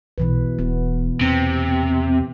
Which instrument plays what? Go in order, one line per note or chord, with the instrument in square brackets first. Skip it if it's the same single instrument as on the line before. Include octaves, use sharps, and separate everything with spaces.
[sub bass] B1 [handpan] B2 E3 B4
[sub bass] D#1 [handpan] B3
[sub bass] E2 [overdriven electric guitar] C3